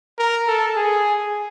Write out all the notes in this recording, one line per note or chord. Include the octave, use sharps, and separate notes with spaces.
A#4
A4
G#4